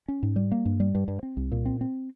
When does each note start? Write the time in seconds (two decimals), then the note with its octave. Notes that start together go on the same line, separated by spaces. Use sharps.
0.08 C#4
0.23 G#2
0.36 G3
0.52 A#3
0.65 G2
0.80 G3
0.95 G2
1.08 G2
1.23 C4
1.37 C2
1.52 A#2
1.66 C4
1.81 C4